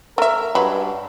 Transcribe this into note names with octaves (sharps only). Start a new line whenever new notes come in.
A3 A#4 E5
G2 F#3 G#3 B4